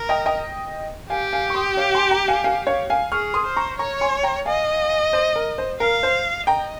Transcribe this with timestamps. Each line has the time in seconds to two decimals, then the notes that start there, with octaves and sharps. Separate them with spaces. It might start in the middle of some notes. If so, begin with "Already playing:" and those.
Already playing: A#4
0.09 D#5 G5
0.26 D#5 G5
1.10 G4 F5 G#5
1.32 F5 G#5
1.50 C#6
1.55 C6 D#6
1.77 C#5 F5
1.94 G#5 C6
2.11 G5 A#5
2.28 F5 G#5
2.44 F5 G#5
2.67 C#5 F5
2.90 F5 G#5
3.12 G#4 C#6 F6
3.34 C6 D#6
3.46 C5
3.56 A#5 C#6
3.79 C#5 A#5 C#6
4.01 G#5 C6
4.23 G5 A#5
4.46 D#5 F5 G#5
5.13 C5
5.36 A#4
5.58 C5
5.80 A#4 F5
6.03 C5
6.47 D#5 G5 A#5